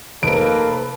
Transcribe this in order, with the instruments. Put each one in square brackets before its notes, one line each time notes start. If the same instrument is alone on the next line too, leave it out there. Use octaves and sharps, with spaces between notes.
[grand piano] F1 D#4 [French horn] A#3 [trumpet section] A4 B4 [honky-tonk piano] D7